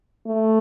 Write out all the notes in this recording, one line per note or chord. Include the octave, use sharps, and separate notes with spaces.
A3